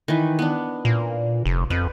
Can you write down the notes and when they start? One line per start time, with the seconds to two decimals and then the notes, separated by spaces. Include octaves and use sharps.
0.08 D#3 E3 B4
0.39 B3 D4
0.85 A#2
1.46 F1
1.70 F2 B4